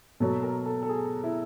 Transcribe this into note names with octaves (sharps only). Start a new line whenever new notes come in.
B2 F#3 A4
A#4
A4
A4
G#4
E4